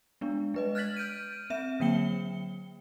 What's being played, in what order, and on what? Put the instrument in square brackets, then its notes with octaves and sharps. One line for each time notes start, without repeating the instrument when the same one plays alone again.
[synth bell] G#3 B3 D4
G#3 B4 D#5
F6 F#6 G#6 A6 B6 F#7
F6 G6 D7 D#7
C4 E5 E7
D3 F#3 A#3 G5 C#7 G7